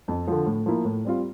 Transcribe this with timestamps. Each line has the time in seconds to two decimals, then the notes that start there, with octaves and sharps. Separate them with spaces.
0.08 F2
0.28 D3 F3
0.46 A2
0.66 F3 A#3 E4
0.85 A2
1.05 G3 C4 F4